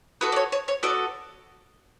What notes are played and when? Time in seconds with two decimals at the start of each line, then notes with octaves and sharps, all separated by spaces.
0.21 B3 F#4 A4 B4
0.32 D5
0.36 C#5
0.52 C#5
0.68 C#5
0.83 B3 F#4 A4 D5